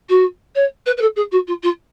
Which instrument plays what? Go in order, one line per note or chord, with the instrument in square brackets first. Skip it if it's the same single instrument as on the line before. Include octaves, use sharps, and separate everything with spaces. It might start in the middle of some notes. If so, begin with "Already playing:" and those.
[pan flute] F#4
C#5
B4
B4
A4
G#4
F#4
F4
F4